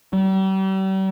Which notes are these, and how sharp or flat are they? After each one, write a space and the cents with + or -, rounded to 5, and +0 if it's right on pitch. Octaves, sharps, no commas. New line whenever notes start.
G3 -40